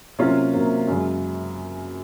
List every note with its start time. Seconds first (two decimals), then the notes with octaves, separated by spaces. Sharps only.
0.19 C3 F#3 A#3 C#4 F4
0.54 C3 F#3 A#3
0.87 F#2 C#3 G#3